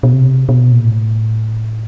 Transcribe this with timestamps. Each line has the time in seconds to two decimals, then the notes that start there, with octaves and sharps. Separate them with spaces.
0.03 B2
0.13 C3
0.49 B2
0.72 A#2
0.85 A2